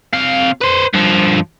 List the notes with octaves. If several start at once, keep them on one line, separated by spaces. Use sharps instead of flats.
C3 F5
B4 C5
G2 F3